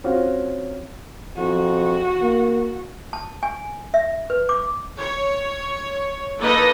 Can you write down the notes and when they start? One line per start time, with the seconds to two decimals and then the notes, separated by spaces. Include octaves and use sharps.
0.04 C4 C#4 F4 F#4
1.37 F2 F#4
2.21 A#3
3.13 A5
3.43 G#5
3.94 E5
4.30 B4
4.49 D6
4.97 C#5
6.39 A#3 D#4 A4 B4 D#5